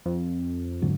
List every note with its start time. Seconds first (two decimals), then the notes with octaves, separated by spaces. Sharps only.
0.06 F2
0.82 G#2 D3 F#3